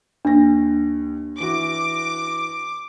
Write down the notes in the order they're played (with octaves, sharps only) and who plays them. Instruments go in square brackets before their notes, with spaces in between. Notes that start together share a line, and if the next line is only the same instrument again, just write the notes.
[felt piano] D#2 A#6 [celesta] D4
[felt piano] E3 F#4 [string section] D6